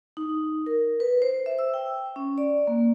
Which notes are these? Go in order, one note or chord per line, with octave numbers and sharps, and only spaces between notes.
D#4
A#4
B4
C5
E5
E6
G5
C#4
D5
A#3